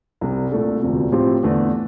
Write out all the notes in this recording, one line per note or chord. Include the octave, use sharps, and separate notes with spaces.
C2 C3 G3
C2 A#2 A3 D4 A4
E1 D2 C3 F3
A2 F3 C4 G4
E2 D3 A3